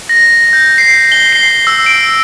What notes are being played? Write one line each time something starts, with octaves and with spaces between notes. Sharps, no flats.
A#6
G6
C7
G7
C7
E6
D7